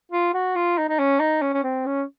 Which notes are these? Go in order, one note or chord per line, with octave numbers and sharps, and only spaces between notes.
F4
F#4
F4
D#4
D#4
C#4
D#4
C#4
C#4
C4
C#4